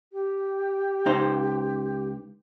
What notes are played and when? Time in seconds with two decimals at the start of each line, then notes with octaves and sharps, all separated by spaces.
0.13 G4
1.06 C#2 D#4 C5